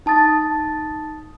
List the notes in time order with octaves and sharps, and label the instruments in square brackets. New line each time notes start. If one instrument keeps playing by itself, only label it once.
[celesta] D#4 A5 D#6 A6